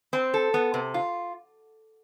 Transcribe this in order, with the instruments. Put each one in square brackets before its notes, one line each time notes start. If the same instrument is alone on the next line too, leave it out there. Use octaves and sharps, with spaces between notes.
[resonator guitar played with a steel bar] C4
A4
B3
C3
F4